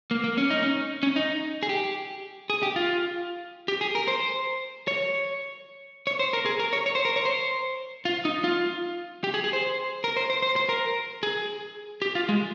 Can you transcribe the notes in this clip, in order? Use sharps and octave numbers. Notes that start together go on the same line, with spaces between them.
A#3
A#3
C#4
D#4
C#4
C#4
D#4
G#4
G4
G#4
G4
F4
G4
G#4
A#4
C5
C#5
C#5
C5
A#4
G#4
A#4
C#5
C#5
C5
A#4
C#5
C5
F4
D#4
F4
G4
G#4
G#4
C5
A#4
C5
C5
C5
C5
A#4
G#4
G4
F4
G#3